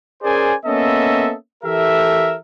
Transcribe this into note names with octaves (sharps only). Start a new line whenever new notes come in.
C#4 G#4 A#4 C5 D5 G#5
A#3 B3 C#4 A4 D#5 E5
E3 G4 A4 A#4 E5